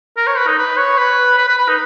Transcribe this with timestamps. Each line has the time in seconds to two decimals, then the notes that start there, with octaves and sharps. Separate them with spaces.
0.17 A#4
0.27 C#5
0.37 B4
0.47 D#4
0.58 B4
0.77 C#5
0.98 B4
1.38 B4
1.48 B4
1.58 B4
1.68 D#4